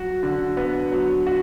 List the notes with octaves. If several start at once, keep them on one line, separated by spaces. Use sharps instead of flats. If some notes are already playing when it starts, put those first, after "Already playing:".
Already playing: F#3 F#4
D3
B3
F#3
F#4